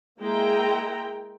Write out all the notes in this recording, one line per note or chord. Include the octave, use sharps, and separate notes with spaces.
G#3 A#3 E4 G5 A#5